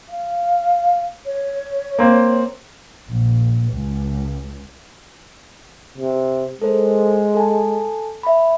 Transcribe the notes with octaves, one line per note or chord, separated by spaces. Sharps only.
F5
C#5
A#3 C4
A#1
C#2
C3
G#3 A4 A#4 C5
A4 G#5 A5
E5 B5